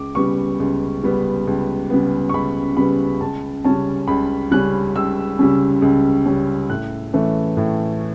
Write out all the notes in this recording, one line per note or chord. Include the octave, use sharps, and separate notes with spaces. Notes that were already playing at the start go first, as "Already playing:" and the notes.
Already playing: C#2 D6
C#3 G3 B3 C#6
C#2
C#3 G3 B3
C#2
C#3 G3 B3
C#6
C#2 B5
C#3 G3 B3 B5
C#2 A5
C#3 G3 C#4 A5
C#2 B5
C#3 G3 C#4 F#6
C#2 E6
C#3 G3 C#4
C#2
C#3 G3 C#4
A2 F#6
E3 A3 C#4
A2